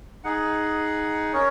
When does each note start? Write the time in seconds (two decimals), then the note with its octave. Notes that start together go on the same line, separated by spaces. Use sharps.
0.24 D#4 G#4 F#5
1.33 C#4 A#4 C#5